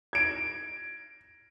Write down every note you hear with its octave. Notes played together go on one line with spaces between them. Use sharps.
G#6 D7